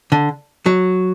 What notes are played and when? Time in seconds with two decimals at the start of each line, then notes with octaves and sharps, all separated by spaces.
0.12 D3
0.66 F#3